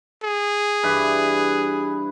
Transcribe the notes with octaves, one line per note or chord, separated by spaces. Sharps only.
G#4
G2 E3 B4